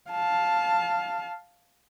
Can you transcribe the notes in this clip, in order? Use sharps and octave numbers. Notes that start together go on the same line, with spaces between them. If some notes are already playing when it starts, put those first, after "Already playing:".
F5 A5